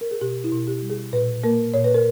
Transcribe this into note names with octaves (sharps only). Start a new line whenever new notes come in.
A#4
G#4
B2 G4
E4
B2
G4
G3
G#4
A#2 B4
A#3 A#4
A#2 C#5
B4
A#4